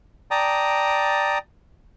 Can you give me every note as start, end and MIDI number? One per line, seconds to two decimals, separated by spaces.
0.31 1.38 74
0.31 1.38 79
0.31 1.38 81
0.31 1.38 82
0.31 1.38 87